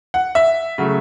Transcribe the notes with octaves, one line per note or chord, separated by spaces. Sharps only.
F#5
E5
C#3 F#3 A3